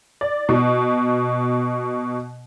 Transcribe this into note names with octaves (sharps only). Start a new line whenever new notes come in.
D5
B2